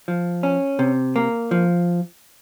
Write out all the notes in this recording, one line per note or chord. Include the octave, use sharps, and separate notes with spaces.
F3
C#4
C3
A#3
F3